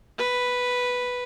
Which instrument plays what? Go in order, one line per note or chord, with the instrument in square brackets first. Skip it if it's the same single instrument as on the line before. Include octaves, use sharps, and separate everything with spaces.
[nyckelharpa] B4